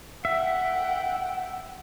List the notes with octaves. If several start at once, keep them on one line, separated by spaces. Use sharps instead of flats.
E5 F#5 G5